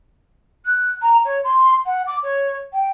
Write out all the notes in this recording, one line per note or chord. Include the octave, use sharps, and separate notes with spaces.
F#6
A#5
C#5
C6
F#5
D6
C#5
G5